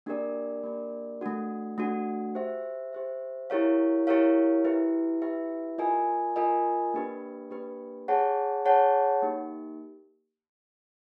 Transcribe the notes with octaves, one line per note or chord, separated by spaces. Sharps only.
A#3 D4 G4 A#4 D5
A#3 D4 G4 A#4 D5
A3 D4 F#4
A3 D4 F#4
G4 C5 E5
G4 C5 E5
E4 G4 A#4 C#5 F5
E4 G4 A#4 C#5 F5
E4 G4 B4 E5
E4 G4 B4 E5
F4 A#4 D#5 G#5
F4 A#4 D#5 G#5
A#3 D4 G4 B4
A#3 D4 G4 B4
G#4 C#5 F#5 A5
G#4 C#5 F#5 A5
A#3 D#4 G4